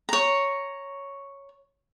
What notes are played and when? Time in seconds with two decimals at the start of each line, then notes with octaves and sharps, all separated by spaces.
0.09 C#5 A#5